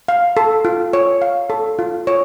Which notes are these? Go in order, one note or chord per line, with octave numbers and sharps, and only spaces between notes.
F5
A4
F4
C#5
F5
A4
F4
C#5